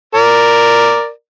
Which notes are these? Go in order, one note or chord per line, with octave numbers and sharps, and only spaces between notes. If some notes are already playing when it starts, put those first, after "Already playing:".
A#4 D5